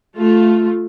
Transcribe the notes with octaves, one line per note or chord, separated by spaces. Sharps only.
A3 F4